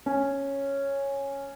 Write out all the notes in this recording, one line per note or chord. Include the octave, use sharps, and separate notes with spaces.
C#4